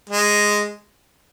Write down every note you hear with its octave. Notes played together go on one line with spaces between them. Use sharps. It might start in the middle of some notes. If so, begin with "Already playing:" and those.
G#3